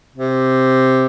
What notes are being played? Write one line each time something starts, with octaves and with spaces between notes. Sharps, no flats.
C3